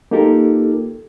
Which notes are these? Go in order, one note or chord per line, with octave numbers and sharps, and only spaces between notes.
A#3 D#4 F4 G4 A4 A#4